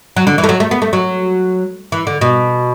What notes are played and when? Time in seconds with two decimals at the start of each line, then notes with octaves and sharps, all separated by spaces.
0.17 F#3
0.27 D3
0.38 E3
0.44 A3
0.49 F#3
0.60 A3
0.71 B3
0.82 A3
0.93 F#3
1.92 E3
2.07 D3
2.21 B2